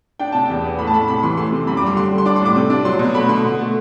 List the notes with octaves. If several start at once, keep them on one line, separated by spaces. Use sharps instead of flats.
D4 G5
C3 A5
E2 G5
B3
A2 B5
A5
A2 B5
C3 B5
E3 C6
A3 C6
C3
F#2 B5
D6
G3 C6
D3 C6
G3
C6
D4 D6
C6
A2 D6
C3
D4
F#3 C6
B2
A3 B5
D3 C6
B2
A3